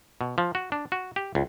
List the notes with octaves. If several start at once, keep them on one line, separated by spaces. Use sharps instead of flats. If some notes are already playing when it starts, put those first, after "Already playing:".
B2
F3
F#4
D4
F#4
G4
C#2